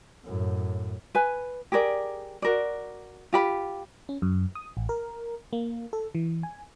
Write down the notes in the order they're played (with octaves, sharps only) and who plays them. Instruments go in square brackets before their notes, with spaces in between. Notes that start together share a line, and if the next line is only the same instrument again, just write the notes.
[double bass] F#2 A2
[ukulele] B4 G#5
G4 G#4 A#4 D5
F#4 A#4 D5
F4 G4 B5
[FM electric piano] C#4
F#2
D#6
A1
A#4
A#3
A4
E3
G#5